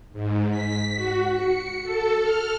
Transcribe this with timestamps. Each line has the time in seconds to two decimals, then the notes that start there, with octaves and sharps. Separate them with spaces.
0.13 G#2
0.51 B6
0.95 F#4
1.33 C#7
1.83 A4
2.21 F6